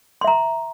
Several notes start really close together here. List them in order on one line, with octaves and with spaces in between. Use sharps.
C6 E5 A#5